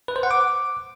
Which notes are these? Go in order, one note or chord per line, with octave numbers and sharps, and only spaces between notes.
B4
C5
F#5
D6